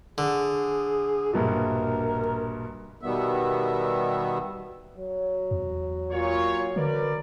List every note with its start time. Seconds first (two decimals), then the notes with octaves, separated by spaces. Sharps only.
0.18 D3 G#4
1.33 A#1 G2 B2 A#4
3.01 B2 D#3 G3 B3 E5
4.98 F#3
5.51 E2
6.12 A#2 F4 C#5
6.76 D3 A#4 B4 D5